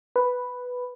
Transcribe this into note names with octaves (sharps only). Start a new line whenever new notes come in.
B4